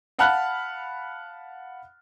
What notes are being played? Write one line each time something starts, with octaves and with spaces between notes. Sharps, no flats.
F5 F#5 A5 B5 F6 F#6